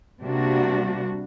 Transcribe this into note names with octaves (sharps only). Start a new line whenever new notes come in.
C3 G3 A#3 D4 F#4